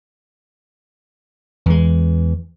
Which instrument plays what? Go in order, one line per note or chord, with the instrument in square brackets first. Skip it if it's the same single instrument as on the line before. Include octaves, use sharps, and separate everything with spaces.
[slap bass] E2 G#3 [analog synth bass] E3